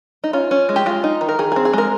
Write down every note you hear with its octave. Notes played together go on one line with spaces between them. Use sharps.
D#4
C#4 F4
C#4
G#3
G4
G#3 F4
D#4
D#3
A#4
D#3 G#4
G#4
C4
G#4
G#3 A#4